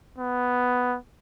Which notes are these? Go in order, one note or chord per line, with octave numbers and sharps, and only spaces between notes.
B3